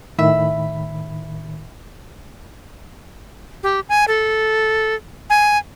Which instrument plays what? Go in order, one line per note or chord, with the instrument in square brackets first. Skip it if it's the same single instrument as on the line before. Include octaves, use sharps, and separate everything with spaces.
[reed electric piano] A2 D#3 B5 [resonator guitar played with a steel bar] E5
[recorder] G4
G#5
A4
G#5